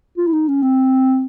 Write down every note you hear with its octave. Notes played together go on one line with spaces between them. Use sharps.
F4
E4
D#4
C#4
C4